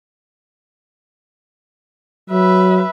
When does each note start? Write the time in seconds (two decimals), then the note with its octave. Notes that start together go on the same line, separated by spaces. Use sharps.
2.30 F#3 B4 E5